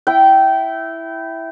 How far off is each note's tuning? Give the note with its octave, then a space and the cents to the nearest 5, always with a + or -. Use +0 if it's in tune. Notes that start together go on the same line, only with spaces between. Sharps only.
E4 +0 G5 -20